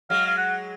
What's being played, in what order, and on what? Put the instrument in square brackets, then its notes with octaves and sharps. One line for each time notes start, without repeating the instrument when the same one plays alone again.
[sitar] F#3 G#3 [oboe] F5
[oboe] F5
F#5